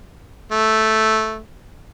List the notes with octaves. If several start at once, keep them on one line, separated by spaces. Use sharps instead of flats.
A3